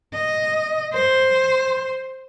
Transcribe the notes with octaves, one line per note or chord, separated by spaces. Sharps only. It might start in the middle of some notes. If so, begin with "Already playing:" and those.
D#5
C5